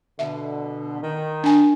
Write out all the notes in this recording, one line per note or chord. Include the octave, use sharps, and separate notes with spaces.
B2 D3 E5
D#3
D4 G#5